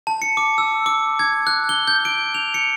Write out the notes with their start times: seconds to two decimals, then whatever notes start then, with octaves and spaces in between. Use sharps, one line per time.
0.07 A5
0.22 C#7
0.37 D6
0.58 E6
0.86 D6
1.19 G#6
1.47 F#6
1.69 G7
1.88 G6
2.05 D7
2.35 F7
2.54 C#7